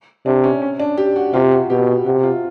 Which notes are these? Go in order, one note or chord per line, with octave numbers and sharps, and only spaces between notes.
C3 D4
C#4
C#4
D4
G4
F#4
C3 F4
F#4
B2 G4
C3 F#4
F4